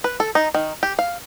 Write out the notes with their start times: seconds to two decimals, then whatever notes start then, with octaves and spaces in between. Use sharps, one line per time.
0.04 B4
0.20 A4
0.35 D#4
0.54 D#3
0.83 G4
0.99 F5